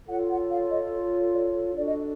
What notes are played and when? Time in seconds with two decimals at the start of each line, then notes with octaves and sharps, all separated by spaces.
0.08 F4 A4 C#5 F#5
0.29 F#5
0.50 F5
0.70 D#5
1.33 D5
1.76 D4 F#4 A4 D5
1.86 D#5